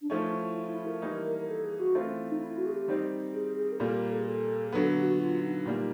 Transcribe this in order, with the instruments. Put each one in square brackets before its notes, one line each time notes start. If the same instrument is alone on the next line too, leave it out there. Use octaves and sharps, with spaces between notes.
[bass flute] D4
[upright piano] F3 A3 C#4 [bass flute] D#4
[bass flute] E4
E4
E4
A#4
[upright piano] E3 G3 A#3 D#4
[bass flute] A4
G#4
F#4
[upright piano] E3 A3 C4 F4
[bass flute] C#4
D#4
E4
F#4
G#4
G4
[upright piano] D#3 G3 C4 D#4
[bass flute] G#4
G#4
A#4
[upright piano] A#2 G3 A#3 [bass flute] A4
[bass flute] A#4
A4
G#4
A4
G#4
[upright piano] D3 F#3 B3 [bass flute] A4
[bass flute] G4
F#4
F4
D#4
[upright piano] A#2 G3 A#3